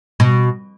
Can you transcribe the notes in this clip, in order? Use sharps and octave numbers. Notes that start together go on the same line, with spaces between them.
B2